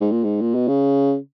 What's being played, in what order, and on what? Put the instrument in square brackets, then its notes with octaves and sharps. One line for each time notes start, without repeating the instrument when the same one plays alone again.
[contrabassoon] G#2
A#2
G#2
A#2
B2
C#3